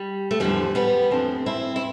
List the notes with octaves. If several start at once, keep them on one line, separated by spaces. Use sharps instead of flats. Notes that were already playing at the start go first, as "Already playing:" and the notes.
Already playing: G3
A3
E2 D3 F3 G3
G3 B3
E2 D3 F3 A3 C4
C4 E4
E4